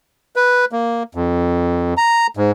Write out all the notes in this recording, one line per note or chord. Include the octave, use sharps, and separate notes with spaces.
B4
A#3
F2
A#5
G#2